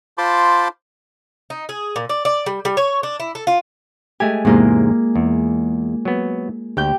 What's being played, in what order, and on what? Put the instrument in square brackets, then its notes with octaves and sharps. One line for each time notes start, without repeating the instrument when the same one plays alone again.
[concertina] F4 C5 A5 B5 C6 D6
[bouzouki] D#4
G#4
A#2
D5
D5
G3
G3
C#5
D4
E4
A4
F4
[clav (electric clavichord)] G#3 A3 G4 [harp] G#5
[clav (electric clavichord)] E2 G#2 C3 [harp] G#3 A#3 F4
[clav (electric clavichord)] E2
F#3 B3
[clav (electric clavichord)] D2 [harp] G4 G6